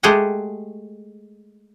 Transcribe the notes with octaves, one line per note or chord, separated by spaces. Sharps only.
G#3 A3 G4 G#4 F#5 G5